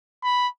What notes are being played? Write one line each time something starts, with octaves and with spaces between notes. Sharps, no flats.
B5